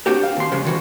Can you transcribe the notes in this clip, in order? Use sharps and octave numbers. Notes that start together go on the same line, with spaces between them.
C4 D4 F#4 G4 A#4
F5
D#2 C6
C#3 F3 G#3 C#4
D#3 E3 F#4